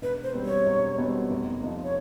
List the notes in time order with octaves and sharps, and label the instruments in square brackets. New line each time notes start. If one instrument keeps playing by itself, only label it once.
[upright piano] E1 [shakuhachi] B4
[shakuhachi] C5
[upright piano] E2 B2 G3 C4
[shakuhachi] C#5
[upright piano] E1
E2 B2 G3 C4
F1
F2 C3 F3
[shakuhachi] C#5